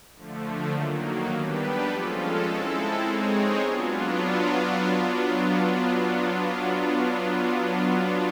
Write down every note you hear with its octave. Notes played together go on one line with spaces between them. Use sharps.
D3 F3 A3
D#3 F#3 A#3
G3 B3 D4 G4 B4
F3 G#3 C#4 F4 A4
G#3 C4 E4 A4
G#3 C4 D#4 G#4 C#5
F#3 B3 D4 F4